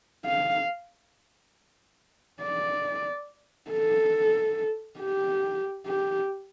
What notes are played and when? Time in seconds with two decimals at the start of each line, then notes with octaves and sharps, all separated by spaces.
0.26 F5
2.42 D5
3.71 A4
5.00 G4
5.87 G4